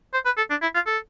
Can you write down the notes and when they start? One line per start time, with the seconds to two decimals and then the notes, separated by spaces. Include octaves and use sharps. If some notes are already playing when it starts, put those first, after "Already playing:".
0.14 C5
0.25 B4
0.37 A4
0.50 D4
0.62 E4
0.75 F4
0.87 A4